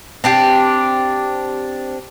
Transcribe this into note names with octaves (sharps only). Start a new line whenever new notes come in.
C4 D4 G4